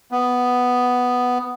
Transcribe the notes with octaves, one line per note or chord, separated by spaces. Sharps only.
B3